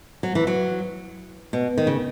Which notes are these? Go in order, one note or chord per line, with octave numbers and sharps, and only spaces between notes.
F#3
E3
F#3
B2
D#3
C#3